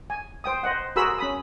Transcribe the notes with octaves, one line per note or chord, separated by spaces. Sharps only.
G#5
C5 G5 D#6
C5 D#5 F#5
F#4 G#4 A#4 B5 C6 E6
C#4 B5 D#6